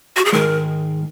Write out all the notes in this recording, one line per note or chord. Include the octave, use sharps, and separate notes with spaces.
F#4
G#4
G#2 D#3 G#3 A#4